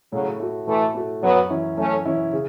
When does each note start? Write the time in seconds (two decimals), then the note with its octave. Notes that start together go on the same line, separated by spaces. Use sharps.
0.12 A2 C#3 F#3
0.40 A3 F#4
0.67 A2 E3 A3
0.95 A3 F#4
1.22 F#2 F#3 B3
1.50 E3 C#4 E4
1.77 F#2 A3 C#4
2.05 E3 C#4 E4
2.33 C#3